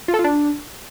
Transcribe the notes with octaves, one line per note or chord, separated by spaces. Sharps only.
F4
A4
F4
D4